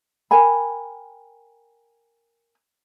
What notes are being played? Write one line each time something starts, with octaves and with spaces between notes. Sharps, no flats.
A#4 G5 G#5 B5